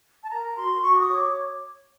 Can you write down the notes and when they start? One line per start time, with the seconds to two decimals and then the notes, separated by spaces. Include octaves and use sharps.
0.24 A5
0.31 A#4 A#5
0.57 F#4 C6
0.82 F#4 C#6
0.96 D6
1.00 D#6
1.08 C#5 C#6
1.17 D6